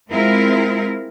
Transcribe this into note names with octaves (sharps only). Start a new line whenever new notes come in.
G#3 C4 E4 F4 A#4